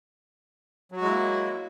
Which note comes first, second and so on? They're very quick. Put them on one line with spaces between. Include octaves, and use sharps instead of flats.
F#3 F#4 G#3 E4 A#3